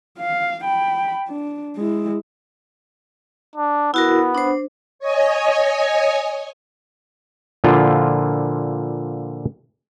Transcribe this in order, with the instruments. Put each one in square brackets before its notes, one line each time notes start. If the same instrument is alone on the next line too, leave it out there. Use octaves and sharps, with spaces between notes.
[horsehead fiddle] F5
G5 B5
D4
G#3 E4
[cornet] D4
[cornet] B3 [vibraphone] E4 F#4 A#4
[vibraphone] D4 C5
[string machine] C#5 D#5 G#5
[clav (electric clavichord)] A#2 D3 F3 E4 F4